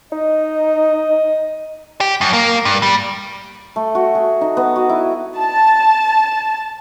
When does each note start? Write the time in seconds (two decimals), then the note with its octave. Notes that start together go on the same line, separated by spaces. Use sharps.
0.12 D#4 D#5
2.01 G4
2.21 F#2
2.33 A#3
2.65 G2
2.83 G3
3.76 A3
3.95 F#4
4.15 G#4
4.41 D#4
4.57 B3
4.76 F#4
4.89 E4
5.39 A5